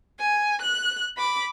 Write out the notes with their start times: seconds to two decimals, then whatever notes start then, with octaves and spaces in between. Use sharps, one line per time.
0.19 G#5
0.62 F#6
1.17 B5 D6